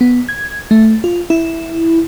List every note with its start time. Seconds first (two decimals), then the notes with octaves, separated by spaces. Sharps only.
0.01 B3
0.29 G#6
0.71 A3
1.04 F4
1.30 E4